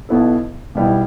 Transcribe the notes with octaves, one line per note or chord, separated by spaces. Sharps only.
B1 B2 B3 E4 A4
B1 B2 G3 B3 E4